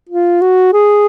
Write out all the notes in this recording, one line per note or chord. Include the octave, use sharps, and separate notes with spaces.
F4
F#4
G#4